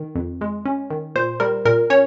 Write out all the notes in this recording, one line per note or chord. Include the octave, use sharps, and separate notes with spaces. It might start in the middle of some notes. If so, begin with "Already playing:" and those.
Already playing: D#3
F2
G#3
C#4
D#3
A#2 C5
G3 A#4
A#2 A#4
C#4 C#5